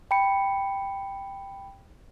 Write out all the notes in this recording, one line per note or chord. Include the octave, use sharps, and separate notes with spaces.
G5 B5 C#7